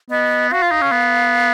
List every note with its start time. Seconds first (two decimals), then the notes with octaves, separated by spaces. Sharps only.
0.10 B3 D#5
0.51 F#4 F5
0.62 F4
0.71 D#4
0.81 C#4
0.92 B3